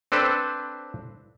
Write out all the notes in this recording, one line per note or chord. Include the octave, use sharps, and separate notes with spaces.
C4 D4 A4 B4 C5